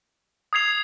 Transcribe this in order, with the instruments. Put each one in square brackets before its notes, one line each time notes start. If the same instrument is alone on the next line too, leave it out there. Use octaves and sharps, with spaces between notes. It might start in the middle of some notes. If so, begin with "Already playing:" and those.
[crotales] D#6 G#6 C7 F7